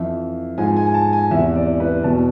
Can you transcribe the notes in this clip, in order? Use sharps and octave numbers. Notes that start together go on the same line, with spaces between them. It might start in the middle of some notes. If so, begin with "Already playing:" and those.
Already playing: F2 E3 E5
G#2 F3 G#5
G#5
G#5
A5
G#5
E2 C3 E3 E5
D5
B4
E2 B2 A5